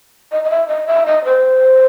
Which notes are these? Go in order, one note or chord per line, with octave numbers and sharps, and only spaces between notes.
D#5
D#5
E5
D#5
E5
D#5
C5